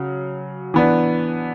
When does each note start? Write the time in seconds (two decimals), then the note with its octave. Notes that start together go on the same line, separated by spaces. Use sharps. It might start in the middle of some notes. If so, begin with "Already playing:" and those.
Already playing: C#3 F#3
0.74 E3 B3 D4